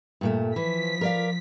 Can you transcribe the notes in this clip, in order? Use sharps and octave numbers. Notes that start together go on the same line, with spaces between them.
G2 A#2 A3
E3 F3 B6
A#4 D5 F5